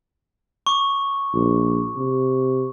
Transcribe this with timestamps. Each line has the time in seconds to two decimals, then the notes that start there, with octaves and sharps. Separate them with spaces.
0.67 C#6 D6
1.34 A#1
1.96 C3